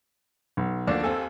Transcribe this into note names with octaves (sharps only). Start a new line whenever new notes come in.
B1
D2 D3 F3 A#3 D4
D#2 C4 A4 G#5